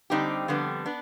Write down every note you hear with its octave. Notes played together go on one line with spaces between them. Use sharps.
D3 G3 C4 D#4 G4
F2 D3 G3 B3
B3 D4